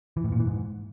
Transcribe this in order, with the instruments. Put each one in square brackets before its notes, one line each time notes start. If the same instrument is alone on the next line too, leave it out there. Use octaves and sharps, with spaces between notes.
[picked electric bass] E3
A2
A#2
E3
G#2